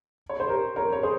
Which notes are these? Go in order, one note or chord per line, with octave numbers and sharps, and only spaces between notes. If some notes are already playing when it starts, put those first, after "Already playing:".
C#5
C5
G4 A#4
A#4 C#5
C#5
G#4 C5